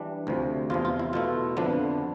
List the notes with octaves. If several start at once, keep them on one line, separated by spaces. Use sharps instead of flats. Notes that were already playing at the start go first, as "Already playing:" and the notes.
Already playing: E3 G3 D4
D2 C3 F3
E2 C3 F3 F4
F4
E4
B2 A3 E4 F4
F2 D3 F3 B3 D4